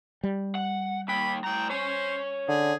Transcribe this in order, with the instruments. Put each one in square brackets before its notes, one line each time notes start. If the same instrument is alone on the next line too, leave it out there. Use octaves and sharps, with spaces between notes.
[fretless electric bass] G3
[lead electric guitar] F#5
[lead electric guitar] D#2 G5 [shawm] B5
[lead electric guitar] A2 A#5 [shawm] G5
[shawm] C5 [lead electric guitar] C#5 G#5
[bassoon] D3 [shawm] G#4